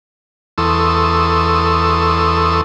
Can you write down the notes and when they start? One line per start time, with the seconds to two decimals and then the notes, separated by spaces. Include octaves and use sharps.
0.58 E2 A4 C6 C#6 D#6 E6